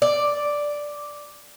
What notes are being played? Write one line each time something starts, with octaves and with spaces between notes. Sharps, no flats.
D5